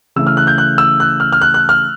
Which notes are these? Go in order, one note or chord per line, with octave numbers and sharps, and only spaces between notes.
C#3 E3 A3 E6
F6
F#6
G6
F#6
E6
F#6
F6
F6
F#6
F#6
F6